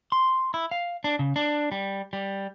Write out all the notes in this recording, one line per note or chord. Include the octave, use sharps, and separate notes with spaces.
C6
E4
F5
D4
C#3
D4
G3
G3